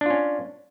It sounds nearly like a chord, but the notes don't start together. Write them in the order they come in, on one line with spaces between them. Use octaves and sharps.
D4 F4 C#4